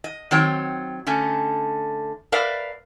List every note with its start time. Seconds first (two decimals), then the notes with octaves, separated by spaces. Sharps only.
0.04 D#5
0.31 D#3 F#3 C4 C#5 G5
1.07 D3 A3 C#4
2.32 A#4 B4 D5 E5 F5